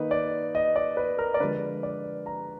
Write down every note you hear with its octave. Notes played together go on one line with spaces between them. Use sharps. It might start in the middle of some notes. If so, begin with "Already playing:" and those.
Already playing: D#3 A#3 D#4 B4
D5
D#5
D5
B4
A#4
D5
D3 F3 G#3 B4
D5
A#5